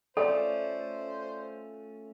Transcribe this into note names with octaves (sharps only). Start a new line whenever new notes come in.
A3 C#4 F4 A4 C5 D5